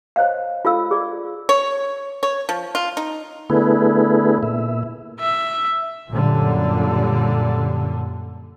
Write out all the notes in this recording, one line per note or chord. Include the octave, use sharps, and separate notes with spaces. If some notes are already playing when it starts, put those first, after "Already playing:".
C5 C#5 D#5 F5
F4 A4 F5 E6
G#4 D5
C#5
C#5
F3
F4
D#4
D3 A3 B3 E4 G#4 B4
A#2 E5
E5
F#2 A#2 D3 G3